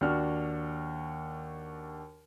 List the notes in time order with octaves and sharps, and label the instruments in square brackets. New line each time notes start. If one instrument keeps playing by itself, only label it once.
[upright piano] D#2 D4 F#4 F6